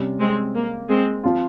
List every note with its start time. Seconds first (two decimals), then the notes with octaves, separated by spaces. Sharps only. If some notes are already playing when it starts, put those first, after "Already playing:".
Already playing: C3 G3 C#4
0.19 G#3 C4
0.54 A#3
0.88 G#3 C4
1.24 F3 C4 F4